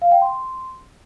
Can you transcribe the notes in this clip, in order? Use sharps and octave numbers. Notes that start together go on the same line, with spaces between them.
F5
G5
C6